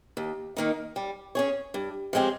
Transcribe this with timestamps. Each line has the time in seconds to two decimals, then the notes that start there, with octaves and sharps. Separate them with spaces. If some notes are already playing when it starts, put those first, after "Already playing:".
0.17 D#2
0.57 D#3 A#3 D#4
0.96 G3
1.35 C#4 G#4 C#5
1.74 G2
2.13 F3 G#3 C4 G4